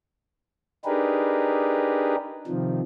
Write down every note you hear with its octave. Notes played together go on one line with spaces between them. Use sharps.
D4 D#4 G4 G#4 A#4 B4
C3 D#3 F3